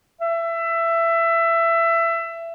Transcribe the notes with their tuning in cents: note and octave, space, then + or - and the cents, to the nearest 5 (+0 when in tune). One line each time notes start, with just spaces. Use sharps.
E5 +20